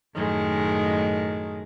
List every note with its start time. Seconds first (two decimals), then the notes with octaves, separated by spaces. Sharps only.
0.14 F#2 A2 D#3 G#3